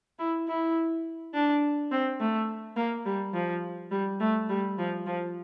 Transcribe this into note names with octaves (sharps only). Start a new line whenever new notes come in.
E4
E4
D4
C4
A3
A#3
G3
F3
G3
A3
G3
F3
F3